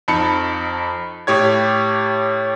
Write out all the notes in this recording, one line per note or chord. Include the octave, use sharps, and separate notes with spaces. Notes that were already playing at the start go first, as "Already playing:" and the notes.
F2 D#4 A5 B5 C#7
A2 G4 C#5 G#6